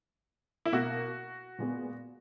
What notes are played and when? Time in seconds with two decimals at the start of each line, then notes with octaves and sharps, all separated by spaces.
0.65 E4
0.72 B2 A#3 F#4
1.59 A#2 G#3 B3